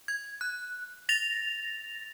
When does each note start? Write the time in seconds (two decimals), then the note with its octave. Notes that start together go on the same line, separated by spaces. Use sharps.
0.08 G#6
0.41 F#6
1.09 A6 A#6 F7